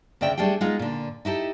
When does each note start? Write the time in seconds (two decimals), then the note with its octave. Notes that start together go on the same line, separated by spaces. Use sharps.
0.21 D2 C#3 D5 E5 G5
0.37 G3 A3 D4 G#4 G5
0.61 G#3 B3 D#4 F4
0.79 A#2 D3
1.25 D#4 E4 G4 A4